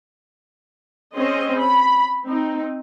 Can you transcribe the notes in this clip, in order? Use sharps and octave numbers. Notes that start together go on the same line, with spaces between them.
C4 C#4 G#4 C5 D#5
B5
C4 D#4